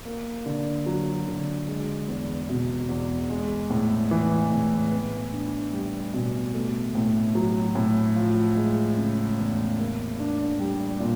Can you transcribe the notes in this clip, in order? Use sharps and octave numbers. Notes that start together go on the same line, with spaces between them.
A#3
D3
F#3
D3
G#3
E2
B2
E2
G#3
A2
E3
A2
B3
D4
G3
B2
A3
A2
F#3
A2
F3
G#3
C#3
E2
A#3
D4
G3
A#2